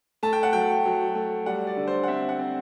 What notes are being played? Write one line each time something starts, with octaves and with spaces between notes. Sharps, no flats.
A3 A5
G5
F#5
F#3 G5
F#3
A3
G3 F#5
D5
D3
C5
F#5
C4 E5
F#5
C4